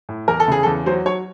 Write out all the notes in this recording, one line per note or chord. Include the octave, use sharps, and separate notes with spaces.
A2
E2 A#4
A4
C#3 G#4
A4
E2
F#3 C5
F#3 C#5